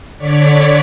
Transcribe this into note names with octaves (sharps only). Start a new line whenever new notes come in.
D3 C#5 D5 B6